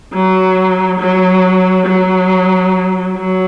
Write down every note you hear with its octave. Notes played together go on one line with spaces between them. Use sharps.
F#3
F#3
F#3
F#3